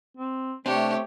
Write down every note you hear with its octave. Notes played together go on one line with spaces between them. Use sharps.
C4
C3 A3 C4 D4 G4 C#5